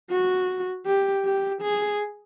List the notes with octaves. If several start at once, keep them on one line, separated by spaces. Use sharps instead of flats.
F#4
G4
G4
G#4